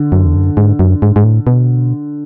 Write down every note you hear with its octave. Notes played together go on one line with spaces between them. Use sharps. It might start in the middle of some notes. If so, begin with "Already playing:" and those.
Already playing: D3
F#2
E2
F#2
G#2
F#2
G#2
G#2
A2
B2